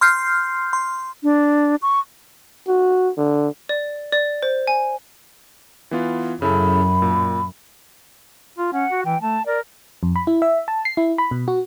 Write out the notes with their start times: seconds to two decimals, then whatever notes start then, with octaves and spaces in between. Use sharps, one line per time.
0.01 C6 F6 G6 C7
0.73 C6
1.23 D4
1.82 C#6
2.67 F#4
3.17 D3
3.69 D5
4.13 D5
4.43 C5
4.67 G#5
5.91 E3 B3 F4
6.42 F#2 C#3 E4 A4 B5
7.02 A#2
8.58 F4
8.73 C#4 F#5
8.90 F#4
9.05 E3 G5
9.21 A3 A5
9.46 A#4 D5
10.03 F2
10.16 B5
10.27 E4
10.42 E5
10.68 A5
10.85 C7
10.97 E4
11.18 B5
11.31 B2
11.48 F#4